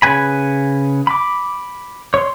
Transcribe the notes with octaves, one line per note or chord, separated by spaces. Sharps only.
C#3 B4 G#5 B5
B5 D6
C#5 C6